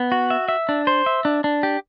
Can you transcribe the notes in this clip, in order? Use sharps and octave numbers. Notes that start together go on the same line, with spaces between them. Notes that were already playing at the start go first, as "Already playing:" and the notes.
Already playing: B3
F#4
E5
E5
D4
C5
E5
D4
D4
G4